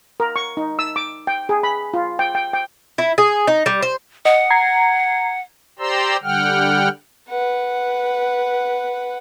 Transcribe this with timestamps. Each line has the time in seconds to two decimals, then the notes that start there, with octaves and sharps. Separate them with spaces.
0.20 A#4
0.36 C#6
0.57 D#4
0.79 E6
0.96 D6
1.27 G5
1.49 G#4
1.63 B5
1.94 F4
2.19 G5
2.35 G5
2.53 G5
2.98 E4
3.18 G#4
3.47 D#4
3.66 G3
3.82 C5
4.25 D#5 F#5
4.50 A#5 G#6 C7
5.79 G4 C5 D5 A#5 C6 E6
6.23 D3 G3 F#5 G5 F6
7.29 B4 F#5